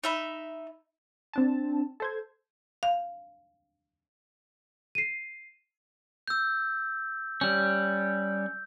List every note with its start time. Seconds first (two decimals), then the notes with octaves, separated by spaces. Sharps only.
0.04 D#4 E5 B5
1.33 C4 D4 A5
2.00 A4 C5 G#6
2.83 F5
4.95 C7 D#7
6.28 E6 G6
7.41 G3 C#4 G6